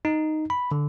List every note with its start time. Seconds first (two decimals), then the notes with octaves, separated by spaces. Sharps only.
0.05 D#4
0.50 B5
0.72 D3